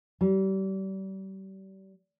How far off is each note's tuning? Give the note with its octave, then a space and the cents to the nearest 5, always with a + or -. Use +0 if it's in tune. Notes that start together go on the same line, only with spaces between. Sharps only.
G3 -35